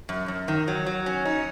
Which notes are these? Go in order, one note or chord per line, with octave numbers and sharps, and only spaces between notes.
F#2
F#2
D#3
F#3
F#3
C#4
D#4